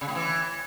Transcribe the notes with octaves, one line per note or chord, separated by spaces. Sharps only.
C#3
A2
E3